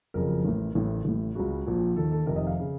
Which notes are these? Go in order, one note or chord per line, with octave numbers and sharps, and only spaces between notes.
F#1 F2 C#3 A#4
A1 A2
A1 A2
A1 A2
C#2 C#3 F#4
A#1 A#2
D#2 D#3 A4
A4
F1 F2 C3 D#3 A#4
D#5
F5
C#3